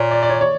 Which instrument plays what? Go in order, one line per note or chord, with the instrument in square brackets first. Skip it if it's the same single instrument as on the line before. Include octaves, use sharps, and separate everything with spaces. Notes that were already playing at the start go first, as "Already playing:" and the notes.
Already playing: [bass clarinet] A#2 [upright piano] C#5
[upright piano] D5
D5
C#5
C#5